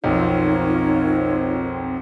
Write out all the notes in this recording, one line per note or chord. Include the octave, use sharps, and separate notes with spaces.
B1 F2 C4 D#4 F4 A#4 C#5